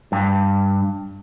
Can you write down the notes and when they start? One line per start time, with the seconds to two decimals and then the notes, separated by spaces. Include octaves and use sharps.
0.12 G2